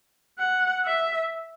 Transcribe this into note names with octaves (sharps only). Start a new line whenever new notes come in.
F#5
E5